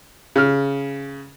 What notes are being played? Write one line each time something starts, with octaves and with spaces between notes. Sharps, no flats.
C#3 F6